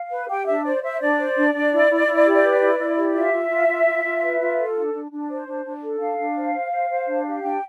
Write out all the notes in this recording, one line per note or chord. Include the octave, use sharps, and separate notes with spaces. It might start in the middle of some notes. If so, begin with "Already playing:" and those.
Already playing: F5
B4
G4 G5
D4 E5
C5 D5
C5 E5
D4 D5
C5
D4
D4
E4
E4
E4
G4
B4
E4
E4
G4
F4 E5
F4
F4
F4
F4
F4
B4
F4
A4
D4
D4
D4
C5
D4
D4
A4
D4 F5
D4
C5
C5
C5
C5
D4
G4
D4 G5